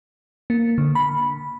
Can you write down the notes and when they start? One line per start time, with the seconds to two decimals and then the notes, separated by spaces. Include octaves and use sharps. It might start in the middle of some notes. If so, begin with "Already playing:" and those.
0.50 A#3
0.78 D3
0.95 B5